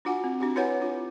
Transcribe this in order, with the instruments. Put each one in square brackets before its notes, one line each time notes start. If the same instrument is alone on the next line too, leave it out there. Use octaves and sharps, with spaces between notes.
[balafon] D4 F4 F#4 F#5 G#5
C4
D4 F#4 G4
E4 B4 C#5 F#5 G#5
D4 F4